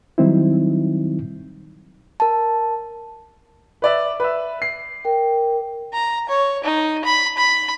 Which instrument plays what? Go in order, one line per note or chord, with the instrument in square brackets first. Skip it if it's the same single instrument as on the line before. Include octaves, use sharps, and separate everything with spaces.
[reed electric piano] D#3 F#3 G3 C4 D#4 E4
[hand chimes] A#4 A5
[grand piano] B4 D5 E5
B4 E5
C7
[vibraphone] A#4 G5
[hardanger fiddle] A#5
C#5
D#4
B5
B5